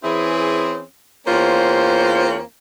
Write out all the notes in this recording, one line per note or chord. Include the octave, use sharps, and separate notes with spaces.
E3 C4 C#4 E4 G#4
E2 A#3 C4 C#4 F4 C5